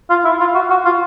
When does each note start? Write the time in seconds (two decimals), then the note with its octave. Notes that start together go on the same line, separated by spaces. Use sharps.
0.10 F4
0.25 E4
0.40 F4
0.55 F#4
0.70 F#4
0.85 F4